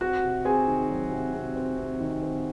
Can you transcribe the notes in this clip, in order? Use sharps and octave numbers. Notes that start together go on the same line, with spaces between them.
C4 F#4 F#5
C3
C4 G#4 G#5
D#3
F#3
C3
C3
C4
C3
D#3
C4